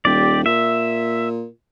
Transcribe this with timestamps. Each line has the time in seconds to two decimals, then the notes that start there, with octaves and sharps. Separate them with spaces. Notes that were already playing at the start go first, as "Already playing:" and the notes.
0.05 D#1 G4 D5
0.46 A#2 E5